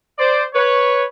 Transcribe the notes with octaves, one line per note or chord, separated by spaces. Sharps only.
C5 D5
B4 C#5